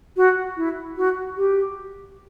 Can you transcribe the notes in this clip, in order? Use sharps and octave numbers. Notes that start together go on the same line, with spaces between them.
F#4
E4
F#4
G4